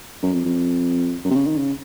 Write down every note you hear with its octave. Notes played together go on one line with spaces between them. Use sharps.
F#2
F2
F2
F#2
C3
C#3
D#3
C#3